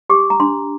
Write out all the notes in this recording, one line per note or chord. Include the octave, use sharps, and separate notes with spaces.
G4 D6
A#5
D4 C6